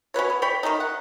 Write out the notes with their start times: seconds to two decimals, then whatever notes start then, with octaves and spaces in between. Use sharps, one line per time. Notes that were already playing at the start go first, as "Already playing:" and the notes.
0.14 C#4 F#4 B4 C#5
0.30 B3
0.42 C#5 D5 G5 B5
0.63 D#3 F#3 C#4 D#4
0.80 F#5